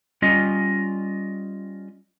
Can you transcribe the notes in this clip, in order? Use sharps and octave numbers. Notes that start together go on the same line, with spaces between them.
G3 C#4 F4 D#5